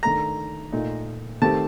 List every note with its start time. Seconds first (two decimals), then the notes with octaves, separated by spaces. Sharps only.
0.03 D#3 A3 D4 A4 A#5
0.72 A#2 A3 D#4
1.42 D#3 A3 C4 G4 A5